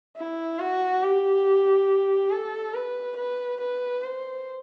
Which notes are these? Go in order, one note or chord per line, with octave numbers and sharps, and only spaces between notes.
E4
F#4
G4
A4
B4
B4
B4
C5